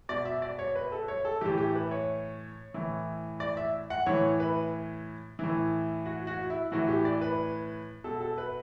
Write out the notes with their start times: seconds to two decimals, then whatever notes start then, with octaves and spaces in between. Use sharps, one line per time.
0.09 B2 D5
0.25 E5
0.42 D5
0.59 C#5
0.75 B4
0.92 A4
1.08 C#5
1.25 A4
1.41 A2 E3 G4
1.57 G4
1.75 B4
1.91 C#5
2.74 A2 E3
3.40 D5
3.57 E5
3.90 F#5
4.06 A2 E3 C#5
4.40 B4
5.39 A2 E3
6.06 F#4
6.27 F#4
6.50 E4
6.72 A2 E3 F#4
6.88 G4
7.05 D5
7.21 B4
8.04 B2 A4
8.20 A4
8.38 B4